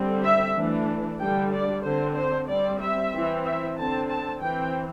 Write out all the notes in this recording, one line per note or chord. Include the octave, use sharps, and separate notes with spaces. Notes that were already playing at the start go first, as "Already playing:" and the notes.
Already playing: D3 G3 C4
E5
E3 A3 D4
D3 G3 D4 G5
D5
D3 C4 C5
C5
G3 C4 D5
E5
E3 C4
E5
D3 C4 A5
A5
E3 C4 G5